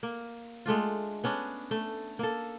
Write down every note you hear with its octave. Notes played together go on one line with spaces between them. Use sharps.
A#3
G#3 A3 D4 F4
B3 C#4 D4
A3
A#3 A4